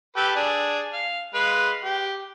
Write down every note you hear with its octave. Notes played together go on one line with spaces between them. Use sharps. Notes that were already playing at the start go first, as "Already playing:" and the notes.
G4 A4 B4
D4 G#4
F5
G#3 B4 F5
G4